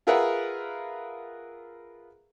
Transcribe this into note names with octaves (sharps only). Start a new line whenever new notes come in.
F4 G#4 A#4 B4 E5 F#5